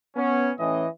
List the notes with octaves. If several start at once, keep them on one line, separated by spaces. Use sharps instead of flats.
B3 C#4
A2 E3 C#4 D#5